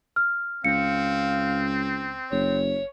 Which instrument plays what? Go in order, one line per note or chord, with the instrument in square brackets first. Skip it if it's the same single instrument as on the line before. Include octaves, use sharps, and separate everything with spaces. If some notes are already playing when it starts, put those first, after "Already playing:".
[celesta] F6
[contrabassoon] C#2 [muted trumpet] C4 [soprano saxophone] F5 [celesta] C#7
[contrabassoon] F#1 [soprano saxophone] C#5